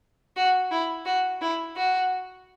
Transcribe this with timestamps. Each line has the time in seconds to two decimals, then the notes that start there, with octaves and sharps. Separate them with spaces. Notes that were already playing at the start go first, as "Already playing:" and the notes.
0.36 F#4
0.71 E4
1.05 F#4
1.41 E4
1.76 F#4